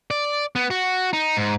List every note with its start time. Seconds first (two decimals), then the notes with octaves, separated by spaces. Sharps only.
0.11 D5
0.56 B3
0.71 F#4
1.13 D#4
1.37 G#2